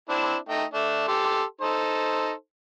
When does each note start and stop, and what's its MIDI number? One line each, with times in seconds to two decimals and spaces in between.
0.09 0.36 60
0.09 0.36 62
0.09 0.36 64
0.49 0.64 57
0.49 0.64 63
0.49 0.64 79
0.74 1.05 57
0.74 1.05 62
1.08 1.43 67
1.08 1.43 69
1.08 1.43 84
1.61 2.31 63
1.61 2.31 69
1.61 2.31 72